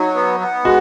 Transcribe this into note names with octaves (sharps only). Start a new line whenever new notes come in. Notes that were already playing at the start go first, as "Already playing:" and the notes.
Already playing: F#3 D#4
B3
B3
G#3 F#4